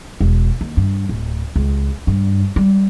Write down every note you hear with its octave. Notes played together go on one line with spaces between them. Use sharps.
E1
D#2
G2
D1
C#2
G2
G3